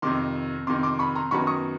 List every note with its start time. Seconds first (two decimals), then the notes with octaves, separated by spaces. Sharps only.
0.02 F2 C3 D#3 C6 D6
0.67 F2 C3 D#3 C6 D6
0.83 C6 D6
0.99 B5 C#6
1.15 A#5 C6
1.31 F#2 D#3 F#3 B3 B5 C#6
1.47 C#6 D#6